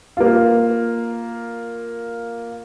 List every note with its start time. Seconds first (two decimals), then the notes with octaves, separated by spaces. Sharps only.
0.17 A#3 F4